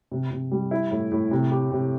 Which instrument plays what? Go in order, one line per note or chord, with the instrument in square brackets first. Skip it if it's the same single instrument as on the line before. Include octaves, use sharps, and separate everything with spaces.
[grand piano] C3
C3
G3
E4
A2
A2
C3
G4
C3